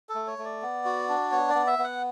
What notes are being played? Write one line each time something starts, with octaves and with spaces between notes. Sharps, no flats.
A4
A3
C#5
A3
D5
B3
F#4
D4
B3 C#5
B3 D5
E5
B3
F#5